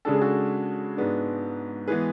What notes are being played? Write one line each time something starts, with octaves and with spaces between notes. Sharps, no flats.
C#3 G#3 D4 A4
G#4
F#4 A4
G#2 G#3 B3 D4
E3 G#3 B3 G#4 B4